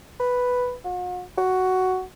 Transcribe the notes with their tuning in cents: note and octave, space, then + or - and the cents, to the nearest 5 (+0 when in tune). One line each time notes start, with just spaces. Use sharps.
B4 +0
F#4 -45
F#4 +5